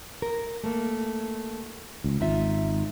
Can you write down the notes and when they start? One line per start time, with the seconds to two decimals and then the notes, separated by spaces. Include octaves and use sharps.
0.22 A#4
0.64 A3 A#3
2.04 C#2
2.21 G#1 D#4 F4 E5